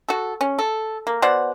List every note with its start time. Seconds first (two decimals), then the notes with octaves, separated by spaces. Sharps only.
0.09 F#4 A4
0.41 C#4
0.59 A4
1.07 A#3
1.22 B2 C5 D5 F#5